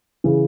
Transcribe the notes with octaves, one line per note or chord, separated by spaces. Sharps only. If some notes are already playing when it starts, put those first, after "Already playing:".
C#3 E3